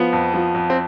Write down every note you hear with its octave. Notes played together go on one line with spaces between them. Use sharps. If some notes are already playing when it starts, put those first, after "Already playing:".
Already playing: F3 B3
F2
F3
F2
C4